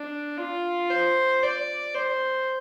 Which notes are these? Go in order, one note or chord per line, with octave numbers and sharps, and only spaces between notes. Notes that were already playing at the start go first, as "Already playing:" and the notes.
Already playing: D4
F4
C5
D5
C5